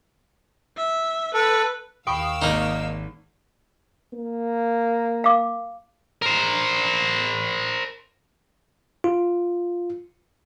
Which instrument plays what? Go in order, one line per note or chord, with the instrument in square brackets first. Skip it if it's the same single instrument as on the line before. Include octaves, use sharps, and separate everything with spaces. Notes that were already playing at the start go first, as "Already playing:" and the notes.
[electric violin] E5
[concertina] A4 [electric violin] B4
[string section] D#2 F5 E6 [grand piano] G5 B5 [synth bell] C#6 D#6 D7
[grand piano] G#1 [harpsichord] A#3 D#4
[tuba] A#3
[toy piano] F5 D6
[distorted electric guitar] A#4 C5
[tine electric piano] F4